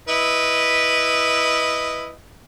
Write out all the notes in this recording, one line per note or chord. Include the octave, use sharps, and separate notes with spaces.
E4 B4 D#5